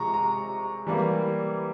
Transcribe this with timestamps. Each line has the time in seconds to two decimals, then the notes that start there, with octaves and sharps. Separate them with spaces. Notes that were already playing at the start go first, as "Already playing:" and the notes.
Already playing: C3 F3 G#3 A#5 C#6
0.14 A#5
0.87 E3 G3 A#3